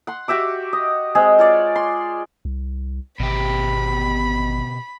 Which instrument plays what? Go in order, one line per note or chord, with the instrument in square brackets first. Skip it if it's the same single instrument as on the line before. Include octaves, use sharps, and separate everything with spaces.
[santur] F#5 C6
F#4 G4 E5 D6
D#5
G#3 C4 G#4
F4 C#5 D5
C6
[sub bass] C2
[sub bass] G#1 [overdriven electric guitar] B2 G4 [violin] B5